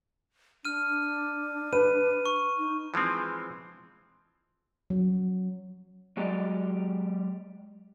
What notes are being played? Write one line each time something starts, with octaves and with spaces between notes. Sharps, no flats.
D4 F6 D#7
B4 D#7
C#6
D#4
E3 F3 G#3 C4
F#3
F#3 G#3 G4 D5 D#5